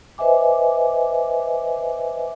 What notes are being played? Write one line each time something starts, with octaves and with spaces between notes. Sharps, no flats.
B4 C5 D#5 E5 G#5 D6